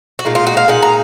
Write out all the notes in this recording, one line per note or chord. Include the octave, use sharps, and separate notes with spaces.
F#4
A#2 G#3 D#4 F4
F4
F#4
F5
A#2 G#3 D#4 F#5
A#5